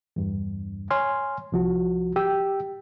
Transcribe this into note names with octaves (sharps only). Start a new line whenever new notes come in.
E2 G2
C#5 G#5 C6 F6
C2 F3 F#4
G4 G5 E6